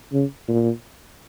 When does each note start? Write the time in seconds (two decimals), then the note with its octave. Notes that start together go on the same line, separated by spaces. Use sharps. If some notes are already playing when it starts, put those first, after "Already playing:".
0.13 C#3
0.48 A#2